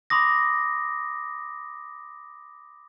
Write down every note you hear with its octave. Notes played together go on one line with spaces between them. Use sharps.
B5 C6 D6 D#6 A#6